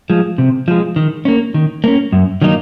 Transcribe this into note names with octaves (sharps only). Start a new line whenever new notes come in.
F3 G#3
C3
F3 G#3
D#3
A#3 C#4
D#3
A#3 C#4
F#2
D#3 F#3 A#3 D#4